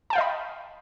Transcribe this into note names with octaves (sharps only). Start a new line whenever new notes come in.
D#5 F5 G5 A5 B5